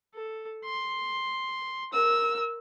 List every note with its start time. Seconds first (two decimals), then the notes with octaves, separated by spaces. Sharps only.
0.15 A4
0.65 C6
1.93 A#4 E6